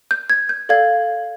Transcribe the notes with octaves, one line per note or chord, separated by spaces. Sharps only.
G6
G#6
G6
A4 D5 F5 G#6